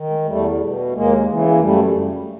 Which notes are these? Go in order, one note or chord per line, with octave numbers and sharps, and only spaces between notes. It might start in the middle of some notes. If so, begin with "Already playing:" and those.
Already playing: D#3
G#3
E2 G3 A3
B2
D#2 G#3 A#3
C#3 E3
B3
A#3
F#2 G3 A3